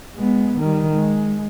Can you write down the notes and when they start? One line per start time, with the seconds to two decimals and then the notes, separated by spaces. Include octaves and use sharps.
0.15 G#3 B3
0.58 D#3 G3
0.92 G#3